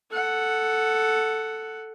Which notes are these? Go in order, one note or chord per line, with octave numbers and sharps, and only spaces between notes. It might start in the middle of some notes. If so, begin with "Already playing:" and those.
A4 F#5